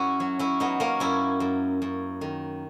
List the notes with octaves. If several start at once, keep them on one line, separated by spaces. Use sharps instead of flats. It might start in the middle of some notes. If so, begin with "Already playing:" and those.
Already playing: F#2 C#4 E4 F#4
F#3
C#4 E4
F#3 B3 D#4
A#3 C#4
F#2 C#4 E4
F#2
F#2
D#3